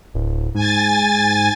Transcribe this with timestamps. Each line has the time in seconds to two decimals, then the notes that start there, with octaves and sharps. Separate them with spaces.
0.14 D1
0.55 G#2 G#5 A6